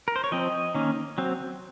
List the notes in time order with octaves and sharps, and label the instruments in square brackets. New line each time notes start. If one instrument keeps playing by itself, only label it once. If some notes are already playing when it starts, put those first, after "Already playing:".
[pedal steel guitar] A#4
C5
C#5
F3 C4 D#5
D#3 A#3 C#4
F#3 C4